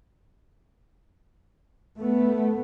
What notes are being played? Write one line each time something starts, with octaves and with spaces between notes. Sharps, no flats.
A3 B3